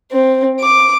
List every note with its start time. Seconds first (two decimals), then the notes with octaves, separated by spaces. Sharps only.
0.12 C4
0.61 D6